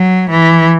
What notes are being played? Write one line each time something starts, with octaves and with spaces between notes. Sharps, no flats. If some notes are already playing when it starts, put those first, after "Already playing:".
Already playing: F#3
E3